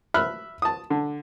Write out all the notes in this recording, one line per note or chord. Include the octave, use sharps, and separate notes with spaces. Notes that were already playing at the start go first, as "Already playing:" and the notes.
E5 B5 F6 F#6
A5 D#6
D3